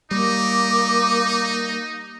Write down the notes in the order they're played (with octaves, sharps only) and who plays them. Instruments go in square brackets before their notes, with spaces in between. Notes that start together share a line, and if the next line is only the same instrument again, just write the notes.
[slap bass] G3 [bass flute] A#3 [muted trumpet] D#4 [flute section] D6